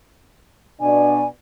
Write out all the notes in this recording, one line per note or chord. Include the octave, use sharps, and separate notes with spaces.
B2 D4 D5 G#5